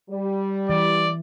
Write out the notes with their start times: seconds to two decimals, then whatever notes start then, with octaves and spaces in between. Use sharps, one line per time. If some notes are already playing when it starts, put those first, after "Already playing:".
0.11 G3
0.69 E3 D5